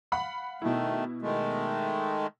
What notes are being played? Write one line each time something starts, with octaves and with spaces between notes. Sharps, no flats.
F5 F#5 B5
B2 D#3 A3 E4
D#3 G#3 A3